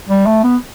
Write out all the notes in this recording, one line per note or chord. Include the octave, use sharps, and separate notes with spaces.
G3
A3
B3